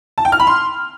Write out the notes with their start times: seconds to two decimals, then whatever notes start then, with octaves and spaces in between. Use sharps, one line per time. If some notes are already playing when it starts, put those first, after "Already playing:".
0.18 A5
0.25 G5
0.32 F6
0.40 B5
0.47 C6